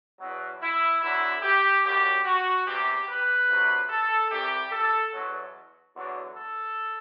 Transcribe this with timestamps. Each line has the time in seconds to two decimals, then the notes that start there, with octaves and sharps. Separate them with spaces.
0.20 E2 B2 F#3
0.61 E4
1.02 D2 D3 F#3 E4
1.43 G4
1.84 F#2 D3 F#3 G4
2.25 F#4
2.66 E2 C3 E3 G4
3.08 B4
3.48 D2 C3 F#3
3.90 A4
4.30 C2 C3 E3 G4
4.72 A4
5.13 E2 B2 F#3
5.95 E2 D3 F#3
6.36 A4